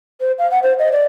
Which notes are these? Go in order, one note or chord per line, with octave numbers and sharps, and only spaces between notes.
C5
F5
F#5
C5
D#5
D5